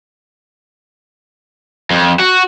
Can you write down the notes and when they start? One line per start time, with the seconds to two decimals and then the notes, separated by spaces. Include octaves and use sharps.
1.90 F2
2.19 F#4